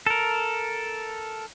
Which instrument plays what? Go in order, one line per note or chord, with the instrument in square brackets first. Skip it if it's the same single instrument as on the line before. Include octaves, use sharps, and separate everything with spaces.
[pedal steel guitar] A4 A#4